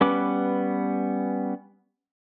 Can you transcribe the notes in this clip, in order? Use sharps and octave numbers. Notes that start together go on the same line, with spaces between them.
G3 B3 C#4 B4 D6